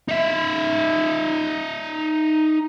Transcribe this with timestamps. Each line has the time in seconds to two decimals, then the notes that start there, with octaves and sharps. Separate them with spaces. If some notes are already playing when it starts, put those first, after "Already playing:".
0.08 D#4 E5